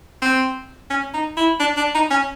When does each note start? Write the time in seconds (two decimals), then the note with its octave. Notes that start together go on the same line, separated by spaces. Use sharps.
0.22 C4
0.90 C#4
1.14 D#4
1.37 E4
1.60 D4
1.77 D4
1.95 D#4
2.11 C#4